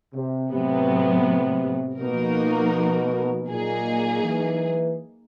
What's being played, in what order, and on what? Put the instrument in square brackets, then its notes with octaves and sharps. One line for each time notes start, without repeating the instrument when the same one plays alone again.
[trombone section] C3
[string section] A2 F#3 B3 [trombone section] C3
[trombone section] B2 [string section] F3 A#3 D#4 F#4 A#4
[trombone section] A#2 [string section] F#3 A#3 D#4 G#4
[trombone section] E3